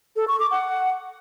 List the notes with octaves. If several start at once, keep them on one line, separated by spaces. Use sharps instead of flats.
A4
C#6
D6
F#5